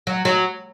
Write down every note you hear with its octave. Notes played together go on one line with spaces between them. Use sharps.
F#3
F#3